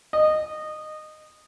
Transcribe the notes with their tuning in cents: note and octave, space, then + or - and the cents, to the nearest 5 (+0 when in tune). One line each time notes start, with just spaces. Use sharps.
D#5 -15